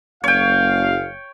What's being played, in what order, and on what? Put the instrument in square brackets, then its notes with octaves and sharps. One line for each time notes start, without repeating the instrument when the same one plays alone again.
[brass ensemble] F#1 F5 [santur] C#5 G5